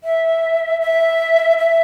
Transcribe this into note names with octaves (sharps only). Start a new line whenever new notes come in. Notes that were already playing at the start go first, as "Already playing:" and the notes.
E5
E5
E5